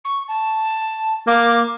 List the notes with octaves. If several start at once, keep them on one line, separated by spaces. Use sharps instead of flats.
C#6
A5
A#3 D6